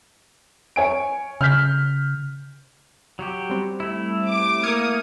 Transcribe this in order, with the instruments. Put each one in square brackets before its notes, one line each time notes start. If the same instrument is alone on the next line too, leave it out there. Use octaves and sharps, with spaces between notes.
[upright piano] C#5 G#5 D7
[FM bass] C#3 [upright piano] F6 G6 B6
[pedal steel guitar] F#3 F#4 G4
[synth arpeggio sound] G3 C4
[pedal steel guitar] A3 E4
[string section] D6
[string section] A#3 D#6 [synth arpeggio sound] F6 G#6 C#7